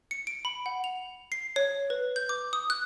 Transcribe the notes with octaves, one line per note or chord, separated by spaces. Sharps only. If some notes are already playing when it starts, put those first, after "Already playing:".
C#7
D7
B5
F#5
F7
C7
C#5
B4
G6
D6
D#6
F#6